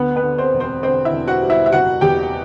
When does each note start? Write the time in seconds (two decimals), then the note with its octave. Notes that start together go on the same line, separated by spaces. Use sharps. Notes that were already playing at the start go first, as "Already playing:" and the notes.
Already playing: D2 B3 B4
0.16 B3 B4
0.23 D3
0.38 C4 C5
0.53 E1
0.60 C4 C5
0.83 D3 C4 C5
1.05 E4 E5
1.12 E1
1.27 F#4 F#5
1.42 G3
1.50 E4 E5
1.66 E5
1.72 F#1 F#4 F#5
2.01 E2 G4 G5